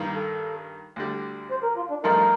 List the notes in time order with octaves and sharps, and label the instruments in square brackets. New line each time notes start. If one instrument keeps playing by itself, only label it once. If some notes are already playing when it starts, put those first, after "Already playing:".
Already playing: [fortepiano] G2 D#3 A#3
[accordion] A4
[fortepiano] D2 D3 G3
[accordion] C5
A#4
F4
D4
[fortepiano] G2 F3 A3 D#4 [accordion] A#4